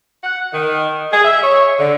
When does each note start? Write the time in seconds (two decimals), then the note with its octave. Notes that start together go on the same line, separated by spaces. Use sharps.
0.23 F#5
0.53 D#3
1.11 G#4
1.24 E5
1.41 C#5
1.78 D3